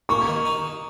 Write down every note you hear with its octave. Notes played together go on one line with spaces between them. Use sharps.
A#3 C#6
D#3
D#4